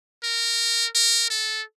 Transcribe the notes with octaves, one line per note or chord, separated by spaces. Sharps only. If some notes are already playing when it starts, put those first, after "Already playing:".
A#4
A#4
A4